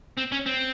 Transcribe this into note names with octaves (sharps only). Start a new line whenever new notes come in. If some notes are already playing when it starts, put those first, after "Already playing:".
C4
C#4
C4